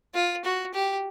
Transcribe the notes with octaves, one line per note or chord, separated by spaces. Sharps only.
F4
F#4
G4